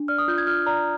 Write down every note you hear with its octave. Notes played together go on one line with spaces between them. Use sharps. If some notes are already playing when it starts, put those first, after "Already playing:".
Already playing: D4
D5 F6
D#6
F4 G6
G#6
F4 F6
D5 A#5